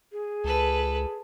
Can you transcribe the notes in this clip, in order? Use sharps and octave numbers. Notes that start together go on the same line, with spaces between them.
G#4
C#2 A4 B4